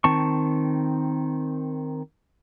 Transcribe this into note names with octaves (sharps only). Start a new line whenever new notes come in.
D#3 C4 A5 C#6